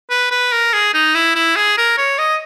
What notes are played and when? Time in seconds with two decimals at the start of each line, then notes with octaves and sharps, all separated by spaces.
0.10 B4
0.31 B4
0.52 A#4
0.73 G#4
0.94 D#4
1.15 E4
1.35 E4
1.56 G#4
1.77 A#4
1.98 C#5
2.18 D#5